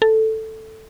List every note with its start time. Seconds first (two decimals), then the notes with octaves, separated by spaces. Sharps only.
0.02 A4